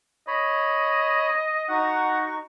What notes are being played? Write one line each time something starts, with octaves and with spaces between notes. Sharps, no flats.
C#5 D#5 B5
D#4 F#4 F#5 C#6